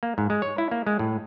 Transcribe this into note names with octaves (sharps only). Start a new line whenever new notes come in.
A#3
G#2
G#3
C#5
E4
A#3
G#3
A2